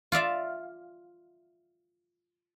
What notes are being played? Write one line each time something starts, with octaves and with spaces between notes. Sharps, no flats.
F4 D5 E5 F5